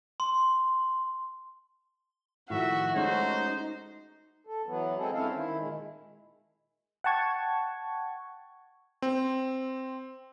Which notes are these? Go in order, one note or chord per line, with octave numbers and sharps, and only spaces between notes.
C6
A2 D#3 F3 F#4 E5
G#3 A3 C#4 D#4 C5
A4
E3 F#3 B3
G#3 C4 G#4 A4
G2 C4 C#4 E4 A4 F5
D#3 E4
A#2 D#3 G#3
F#5 G5 A5 C#6 G#6
C4